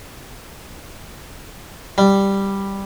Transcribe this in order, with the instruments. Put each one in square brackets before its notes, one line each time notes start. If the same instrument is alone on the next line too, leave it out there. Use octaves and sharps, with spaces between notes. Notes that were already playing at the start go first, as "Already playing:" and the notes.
[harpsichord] G3